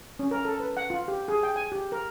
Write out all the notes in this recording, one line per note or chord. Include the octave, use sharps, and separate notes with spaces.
C#4
A#4
A4
B4
F#5
F4
G4
G#4
G5
G#5
G4
A#4